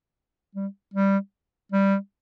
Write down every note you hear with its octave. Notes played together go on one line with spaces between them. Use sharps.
G3
G3
G3